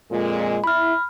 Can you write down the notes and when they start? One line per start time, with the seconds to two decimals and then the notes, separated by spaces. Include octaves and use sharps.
0.10 F2 A#2 G#3
0.64 E4 B5 F6